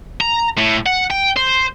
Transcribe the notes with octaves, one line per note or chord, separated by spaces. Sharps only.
A#5
A2
F#5
G5
C5